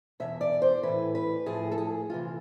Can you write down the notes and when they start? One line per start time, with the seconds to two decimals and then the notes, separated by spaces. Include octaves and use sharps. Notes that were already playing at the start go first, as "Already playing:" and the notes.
0.20 E2 B2 E5
0.41 D5
0.62 C5
0.83 A2 E3 B4
1.15 B4
1.46 A2 F3 G#4
1.72 A4
1.78 G#4
2.10 D2 C3 E3 F4